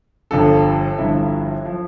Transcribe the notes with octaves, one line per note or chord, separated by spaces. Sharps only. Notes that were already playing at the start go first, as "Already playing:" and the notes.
G1 G2 F3 A4
G1 G2 F3 E4 E5
F3